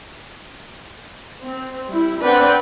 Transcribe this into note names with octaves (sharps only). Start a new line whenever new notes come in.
C4
G3 E4
C4 D4 B4 D5 F#5 G5